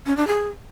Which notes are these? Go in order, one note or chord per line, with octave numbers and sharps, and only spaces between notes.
C#4
D4
G#4